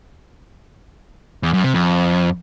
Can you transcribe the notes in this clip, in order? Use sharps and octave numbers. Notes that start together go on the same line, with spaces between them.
E2
F#2
C3
F2